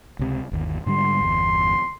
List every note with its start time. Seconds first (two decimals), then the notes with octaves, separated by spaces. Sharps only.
0.19 C#2 C3
0.52 G1 D#2
0.86 G#2 D3 G3 C6
1.21 G1 E2